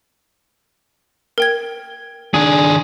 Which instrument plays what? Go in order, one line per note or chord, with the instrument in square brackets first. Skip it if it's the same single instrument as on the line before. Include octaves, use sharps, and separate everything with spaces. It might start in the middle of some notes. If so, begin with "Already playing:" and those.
[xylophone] A#4 G5 G#6
[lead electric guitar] D#3 D4 [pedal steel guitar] G#4